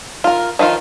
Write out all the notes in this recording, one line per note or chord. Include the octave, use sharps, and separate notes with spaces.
F4 A#4
D#3 F3 D#4 F4